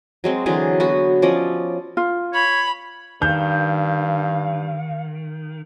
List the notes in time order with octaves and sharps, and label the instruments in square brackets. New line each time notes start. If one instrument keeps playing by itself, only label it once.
[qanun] F#3 G#3 C4
D3 E3 F#3 G#4
B3 F#4 B5
F3 C#4 D5 D#5
[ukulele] F4
[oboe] C#5 [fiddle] B5
[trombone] G2 [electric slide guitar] D#3 [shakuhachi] F5 [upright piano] G6